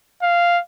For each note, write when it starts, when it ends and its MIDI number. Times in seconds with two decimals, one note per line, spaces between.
0.22 0.60 77